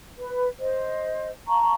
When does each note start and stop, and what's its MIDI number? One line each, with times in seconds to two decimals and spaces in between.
0.18 0.47 71
0.60 1.29 72
0.60 1.29 75
1.47 1.74 77
1.47 1.74 81
1.47 1.74 82
1.47 1.74 85